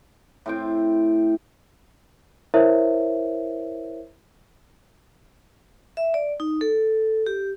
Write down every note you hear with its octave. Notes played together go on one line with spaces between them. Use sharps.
A2 C4 G5
E4 A#4 C5 C#5 E5
E5
D5
D#4
A4
G4